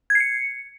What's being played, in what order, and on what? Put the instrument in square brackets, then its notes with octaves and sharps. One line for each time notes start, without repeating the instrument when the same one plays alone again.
[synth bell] G#6
C7
C#7